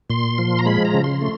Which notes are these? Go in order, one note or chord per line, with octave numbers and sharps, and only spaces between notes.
A#2 C6
F3
A#5
G#3 B5
A#5
C#3
C6
A3